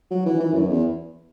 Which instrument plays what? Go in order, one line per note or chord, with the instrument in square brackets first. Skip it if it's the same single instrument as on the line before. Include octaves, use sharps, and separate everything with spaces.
[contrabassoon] F#3
E3
E3
F#2
E2